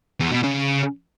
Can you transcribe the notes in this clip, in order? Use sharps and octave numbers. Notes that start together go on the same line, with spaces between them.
E2
B2
C#3